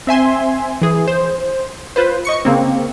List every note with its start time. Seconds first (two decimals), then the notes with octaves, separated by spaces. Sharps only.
0.07 C4 E5 G#5 C6
0.81 E3 G#4
1.07 C5
1.96 F4 B4 C5
2.25 D#5 C#6 C#7
2.45 C#3 A#3 C4